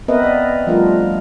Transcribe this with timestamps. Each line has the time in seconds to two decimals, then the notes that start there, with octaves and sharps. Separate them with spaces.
0.08 B3 C4 A#4 B4 D#5 E5
0.23 D5 D#5
0.67 F3 G3 A3 D4 F4 A#4